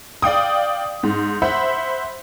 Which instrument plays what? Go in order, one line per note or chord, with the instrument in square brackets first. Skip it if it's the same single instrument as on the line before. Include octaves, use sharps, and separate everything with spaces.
[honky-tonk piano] D5 F5 G5 D#6
G#2
C5 E5 F#5 B5